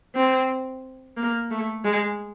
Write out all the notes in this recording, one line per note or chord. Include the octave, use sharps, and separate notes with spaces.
C4
A#3
A3
G#3